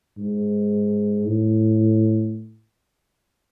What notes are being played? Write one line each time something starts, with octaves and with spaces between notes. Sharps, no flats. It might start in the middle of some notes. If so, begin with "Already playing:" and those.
G#2
A2